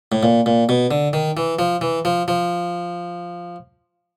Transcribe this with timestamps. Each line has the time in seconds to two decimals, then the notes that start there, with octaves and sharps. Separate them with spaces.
0.12 A2
0.23 A#2
0.46 A#2
0.69 B2
0.91 D3
1.13 D#3
1.37 E3
1.59 F3
1.81 E3
2.05 F3
2.28 F3